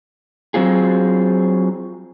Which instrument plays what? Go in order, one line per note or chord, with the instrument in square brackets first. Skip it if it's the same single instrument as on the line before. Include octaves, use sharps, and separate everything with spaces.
[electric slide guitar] F#3 C4 F4 G#4